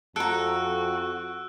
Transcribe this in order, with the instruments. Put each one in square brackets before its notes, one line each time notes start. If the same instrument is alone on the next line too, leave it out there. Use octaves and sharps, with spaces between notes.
[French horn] F2 [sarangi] F#4 [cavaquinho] A4 A#5 [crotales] E6 F#6 D7